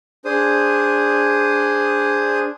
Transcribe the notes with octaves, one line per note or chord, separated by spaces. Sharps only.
D4 G#4 C5 D#6